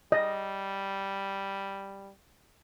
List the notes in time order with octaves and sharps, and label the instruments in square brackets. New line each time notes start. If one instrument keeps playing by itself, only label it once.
[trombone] G3 [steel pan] D#5